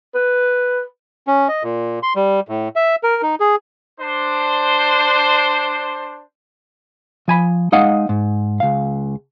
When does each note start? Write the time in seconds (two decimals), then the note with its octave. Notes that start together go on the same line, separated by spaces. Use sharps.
0.14 B4
1.27 C#4
1.48 D#5
1.63 A#2
2.03 C6
2.16 G3
2.48 A2
2.76 E5
3.03 A#4
3.23 D#4
3.40 G#4
4.00 D4 C5
7.28 F3 G#5 B5
7.72 G#3 D#4 D#5 F5 F#5
8.09 G#2
8.60 C#2 F5